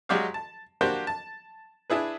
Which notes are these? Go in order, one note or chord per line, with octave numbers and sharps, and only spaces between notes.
F#3 G#3 F#4 G4 D5 F5
A5
A#3 D4 F#4 G4 C5
A5
D4 E4 G#4 B4